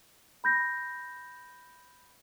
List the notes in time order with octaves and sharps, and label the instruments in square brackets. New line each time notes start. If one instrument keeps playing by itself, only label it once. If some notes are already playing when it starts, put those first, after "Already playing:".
[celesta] B5 G6 A#6